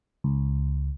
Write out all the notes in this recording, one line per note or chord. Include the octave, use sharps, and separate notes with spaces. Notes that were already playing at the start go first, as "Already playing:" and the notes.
C#2